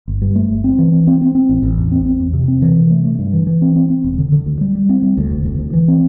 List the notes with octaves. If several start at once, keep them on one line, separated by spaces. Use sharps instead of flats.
G1
G2
A3
G1
C4
E3
C4
C4
C4
C4
A1
A1
E2
C4
C4
E2
C3
C4
E3
C3
A3
A3
G2
E3
E3
C4
C4
C4
E1
D3
D3
D2
G3
G3
C4
G3
D2
E1
D2
D2
E3
C4